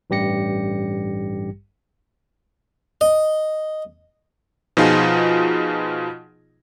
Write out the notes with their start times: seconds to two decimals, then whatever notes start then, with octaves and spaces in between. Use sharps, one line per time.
0.10 A1 G2 G3 G4 A#6 C#7
3.01 D#5
4.77 B2 F3 D#4 F4 G#4